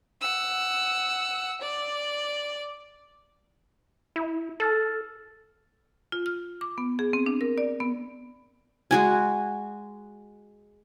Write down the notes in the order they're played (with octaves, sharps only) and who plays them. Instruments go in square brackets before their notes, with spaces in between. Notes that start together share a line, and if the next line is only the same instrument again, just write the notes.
[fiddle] F#5 E6
D5
[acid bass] E4
[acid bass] A4 [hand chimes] E6 F6 A6
[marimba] F4
F6
D6
B3
G#4
C4
D4
A#4
D5
B3
[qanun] G#3 F#4 G#5